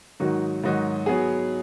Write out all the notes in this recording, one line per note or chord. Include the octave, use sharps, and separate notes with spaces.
G#2 D#3 F#3 D#4 F#4
G#2 D#3 F#3 D#4 F#4
F#3 B3 G#4